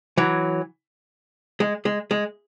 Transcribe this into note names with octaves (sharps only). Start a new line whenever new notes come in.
E3 F#3
G#3
G#3
G#3